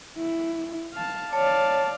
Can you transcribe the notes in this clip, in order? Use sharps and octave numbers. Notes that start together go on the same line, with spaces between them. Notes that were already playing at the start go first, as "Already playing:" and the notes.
E4
F5 A5
C#5 D5 F5 A5